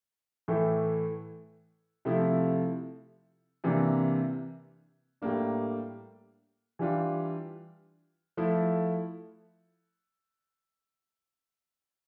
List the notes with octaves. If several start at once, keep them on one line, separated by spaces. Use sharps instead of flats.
A2 E3 A3 E4
C3 F3 A3 E4
C3 E3 A#3 D4
A2 G3 A#3 D4
E3 G3 D4 F4
F3 A3 E4